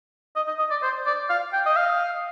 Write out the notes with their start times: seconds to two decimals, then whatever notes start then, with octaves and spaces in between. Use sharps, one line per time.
0.36 D#5
0.47 D#5
0.59 D#5
0.70 D5
0.82 C5
1.06 D5
1.30 F5
1.53 G5
1.66 D#5
1.76 F5